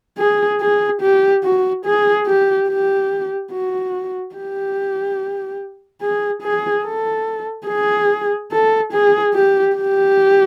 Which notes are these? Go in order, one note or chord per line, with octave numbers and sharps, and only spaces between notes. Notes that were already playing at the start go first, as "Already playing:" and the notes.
G#4
G#4
G4
F#4
G#4
G4
G4
F#4
G4
G#4
G#4
A4
G#4
A4
G#4
G4
G4